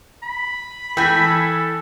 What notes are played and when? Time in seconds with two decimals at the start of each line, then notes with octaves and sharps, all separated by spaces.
0.23 B5
0.97 E3 A4 G5 G#5